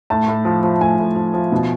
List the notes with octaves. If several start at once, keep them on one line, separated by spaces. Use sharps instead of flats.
A2 A5
A2
F3
F3
A2 G#5
A2
F3
F3
B2